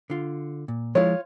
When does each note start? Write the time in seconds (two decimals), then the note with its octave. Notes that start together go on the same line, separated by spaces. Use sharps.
0.10 D3 F4
0.68 A#2
0.95 F3 G#3 E4 F4 C#5